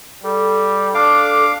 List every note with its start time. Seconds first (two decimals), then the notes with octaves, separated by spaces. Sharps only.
0.24 G3 A4
0.94 D4 F5 D6